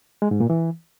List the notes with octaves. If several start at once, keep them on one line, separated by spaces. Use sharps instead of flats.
G#3
G#2
A#2
E3